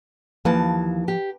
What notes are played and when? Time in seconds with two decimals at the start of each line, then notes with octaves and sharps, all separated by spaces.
0.45 D#2 E3 F3 A5
1.08 G4